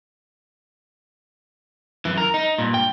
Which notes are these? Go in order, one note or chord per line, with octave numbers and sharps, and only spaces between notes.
F#2 E3
A#4
D#4
G2 A#2
G5